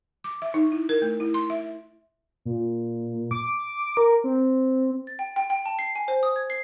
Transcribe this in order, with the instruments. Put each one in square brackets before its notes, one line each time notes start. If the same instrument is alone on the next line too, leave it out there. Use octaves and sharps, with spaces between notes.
[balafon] D6
E5
D#4
E4
A#4
A3
E4
C6
E5
[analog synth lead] A#2
D6
A#4
C4
[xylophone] A6
G5
G5
G5
A5
C7
G#5
C5
D#6
G#6
C7